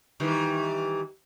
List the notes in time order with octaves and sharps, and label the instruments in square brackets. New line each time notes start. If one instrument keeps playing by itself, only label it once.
[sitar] D#3 E3 G3